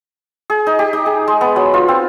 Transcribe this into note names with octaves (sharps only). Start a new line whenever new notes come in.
G#4
D#4
G4
D#4
G#4
G#3
B3
F#3
F4
C4